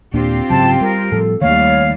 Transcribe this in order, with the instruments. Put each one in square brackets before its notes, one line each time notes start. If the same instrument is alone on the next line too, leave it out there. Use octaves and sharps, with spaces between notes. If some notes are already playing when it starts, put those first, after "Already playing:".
[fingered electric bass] D#2 A#2 A#3 [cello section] C4 F4 G4 [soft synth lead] D4
[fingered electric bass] G#2 C#3 F#3 [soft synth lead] G5 [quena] A5
[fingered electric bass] G3 [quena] A#4
[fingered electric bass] A2 F3 G3 [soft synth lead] A4
[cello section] D#2 G3 [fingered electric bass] D#3 A3 A#3 [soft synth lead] C#5 [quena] F5